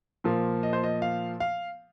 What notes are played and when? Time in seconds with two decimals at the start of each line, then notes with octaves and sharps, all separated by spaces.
0.24 A#2 F3 A#3
0.63 D#5
0.73 C5
0.84 D#5
1.02 F5
1.40 F5